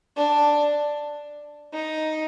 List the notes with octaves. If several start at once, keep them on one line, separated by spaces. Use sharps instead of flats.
D4
D#4